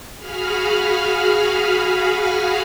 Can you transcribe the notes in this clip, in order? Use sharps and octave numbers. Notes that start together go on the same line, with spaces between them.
F#4 G#4 F5 B5 F6